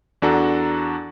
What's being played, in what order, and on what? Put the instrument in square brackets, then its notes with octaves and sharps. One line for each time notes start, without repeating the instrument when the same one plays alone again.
[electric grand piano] E2 D4 F#4 A4 A#5